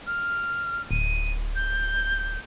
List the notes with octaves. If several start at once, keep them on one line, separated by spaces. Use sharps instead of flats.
F6
D1 D#7
G6